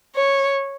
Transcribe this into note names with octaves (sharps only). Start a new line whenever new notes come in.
C#5